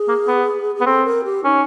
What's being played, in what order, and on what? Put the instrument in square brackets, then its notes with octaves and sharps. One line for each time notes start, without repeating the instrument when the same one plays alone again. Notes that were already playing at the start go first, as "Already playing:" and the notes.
Already playing: [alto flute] G#4
[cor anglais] A#3
B3
[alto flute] G#4
[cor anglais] B3
[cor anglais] C4 [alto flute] A4
[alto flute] A#4
G4
[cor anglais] C#4 [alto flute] D#4